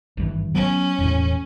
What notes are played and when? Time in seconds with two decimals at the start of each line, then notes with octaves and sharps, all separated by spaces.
0.17 G#1 G2 E3
0.54 F#3 B3 C#4
0.98 E1 E2 A2